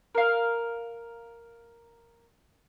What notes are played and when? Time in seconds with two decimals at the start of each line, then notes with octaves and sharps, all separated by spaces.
0.15 A#4 F5